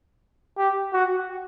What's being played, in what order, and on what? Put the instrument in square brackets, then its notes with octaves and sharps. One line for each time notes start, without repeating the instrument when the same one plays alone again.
[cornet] G4
F#4